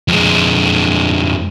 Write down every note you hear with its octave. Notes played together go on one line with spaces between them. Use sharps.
F2 G#3